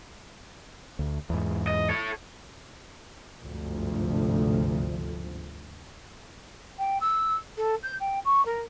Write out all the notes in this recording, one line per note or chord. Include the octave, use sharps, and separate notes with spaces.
D2
E2 G#2
D#5
A4 C#5
G1 D2 G#2 C3 F3
G5
E6
A4
G6
G5
C#6
A#4